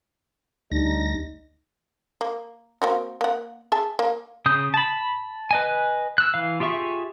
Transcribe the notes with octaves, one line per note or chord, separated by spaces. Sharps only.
D2 G3 D4 D#4 A#6
A#3
A#3 C4 F#4
A#3 F#5
G#4 E5 A5
A#3
C#3 D#6 G6
A5 B5
B4 D#5 G#5
E6 F#6
E3 F5
F4 G4 G#4 E5 C#6